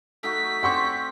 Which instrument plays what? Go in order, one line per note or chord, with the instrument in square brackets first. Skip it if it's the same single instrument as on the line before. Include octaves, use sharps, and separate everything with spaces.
[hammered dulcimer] A3 D#4 F#4 [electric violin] B6
[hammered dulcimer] C4 C5 D5 [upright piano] F#5 C6 C#6